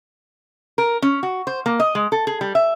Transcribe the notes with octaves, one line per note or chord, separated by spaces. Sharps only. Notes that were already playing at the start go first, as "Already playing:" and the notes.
A#4
C#4
F#4
C5
A#3
D#5
G#3
A4
G#4
G3
E5